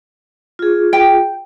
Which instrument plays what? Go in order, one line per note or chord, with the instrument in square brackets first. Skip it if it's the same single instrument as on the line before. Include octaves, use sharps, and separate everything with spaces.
[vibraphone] F4 G#4
[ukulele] G5